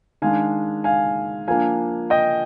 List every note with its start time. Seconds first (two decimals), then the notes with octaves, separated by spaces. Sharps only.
0.22 D#3 G#3 D4 F5 G#5
0.84 F5 G#5
1.48 F3 A#3 D4 F5 G#5
2.10 D#5 G5